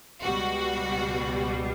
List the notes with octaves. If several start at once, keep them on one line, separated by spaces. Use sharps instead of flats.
C#2 B2 G3 F#4